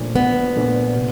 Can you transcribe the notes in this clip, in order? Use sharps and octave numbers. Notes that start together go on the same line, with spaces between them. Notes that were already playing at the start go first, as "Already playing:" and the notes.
Already playing: A#2 F3 A3 D4
A#1 B3
A#2 F3 A3 D4
C3